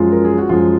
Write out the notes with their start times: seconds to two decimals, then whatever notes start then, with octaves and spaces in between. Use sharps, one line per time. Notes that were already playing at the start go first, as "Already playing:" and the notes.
Already playing: F#2 F3 G#3 F4
0.12 A#4
0.25 G#4
0.38 F#4
0.49 F#2 F3 G#3 F4